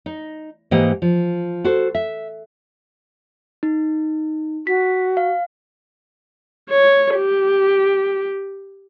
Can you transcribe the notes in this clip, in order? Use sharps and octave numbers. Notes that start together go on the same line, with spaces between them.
D#4
G#2 E3 A#3 G4 D#5 F#5
F3
F#4 A4 C5
E5
D#4
F#4 B6
F5
C#5
G4